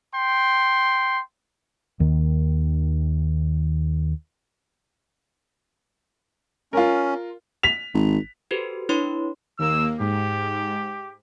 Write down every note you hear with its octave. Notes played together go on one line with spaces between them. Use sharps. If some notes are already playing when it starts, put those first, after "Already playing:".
G5 C6
D#2 D#3
C#4 F4 A#4
B6 F7
G#1
F#4 G4 A4 B4 C5
D4 E4 B4 C#5 B5 C6
D#2 A#3 E6
G#2 G4